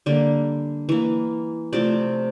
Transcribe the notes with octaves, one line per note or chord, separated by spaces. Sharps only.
D3 G3 A#3
E3 A#3
C3 F3 A3 D5